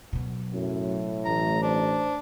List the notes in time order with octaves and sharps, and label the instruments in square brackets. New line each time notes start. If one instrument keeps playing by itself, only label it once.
[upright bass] B2 F#3
[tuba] F#2 [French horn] A2
[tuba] A1 [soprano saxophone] A#5
[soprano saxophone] D4 [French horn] C5